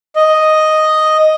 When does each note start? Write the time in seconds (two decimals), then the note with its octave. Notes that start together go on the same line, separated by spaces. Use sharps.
0.16 D#5